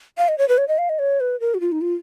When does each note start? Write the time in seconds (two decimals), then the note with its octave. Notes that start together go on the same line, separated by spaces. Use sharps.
0.18 F5
0.28 D#5
0.38 C#5
0.49 B4
0.58 C#5
0.68 D#5
0.78 F5
0.89 D#5
0.99 C#5
1.20 B4
1.40 A#4
1.54 F#4
1.61 F4
1.72 D#4
1.81 F4